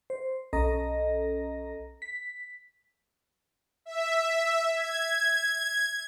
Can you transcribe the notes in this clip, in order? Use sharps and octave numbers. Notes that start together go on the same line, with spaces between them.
C5
B1 C#4 A4 D#5 A#5 A#6
B6
E5
G#6